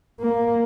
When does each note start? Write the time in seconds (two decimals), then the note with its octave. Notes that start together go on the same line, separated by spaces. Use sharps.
0.20 A#3